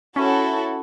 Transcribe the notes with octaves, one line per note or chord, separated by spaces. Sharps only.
C#4 E4 F#4 A4